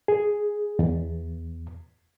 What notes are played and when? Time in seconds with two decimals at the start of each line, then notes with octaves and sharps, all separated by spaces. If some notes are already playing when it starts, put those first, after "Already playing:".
0.08 G#4
0.79 E2